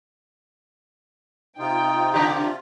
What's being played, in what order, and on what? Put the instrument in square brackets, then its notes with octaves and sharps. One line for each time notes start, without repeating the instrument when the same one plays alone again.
[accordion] C3 F4 [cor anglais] D#4 [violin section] G5
[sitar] C#3 D4 G4